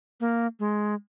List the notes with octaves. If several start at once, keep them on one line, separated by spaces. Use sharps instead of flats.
A#3
G#3